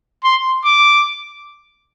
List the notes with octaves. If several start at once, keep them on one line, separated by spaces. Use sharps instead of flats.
C6
D6